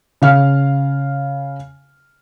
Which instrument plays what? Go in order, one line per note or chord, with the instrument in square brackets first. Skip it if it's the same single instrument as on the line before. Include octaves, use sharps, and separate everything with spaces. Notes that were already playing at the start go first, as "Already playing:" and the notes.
[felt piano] C#3 F5 F6